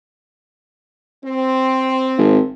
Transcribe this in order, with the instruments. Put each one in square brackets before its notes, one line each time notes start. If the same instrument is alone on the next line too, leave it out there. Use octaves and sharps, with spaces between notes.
[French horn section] C4
[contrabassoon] G#1